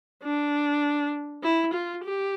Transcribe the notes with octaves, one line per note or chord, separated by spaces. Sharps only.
D4
E4
F4
G4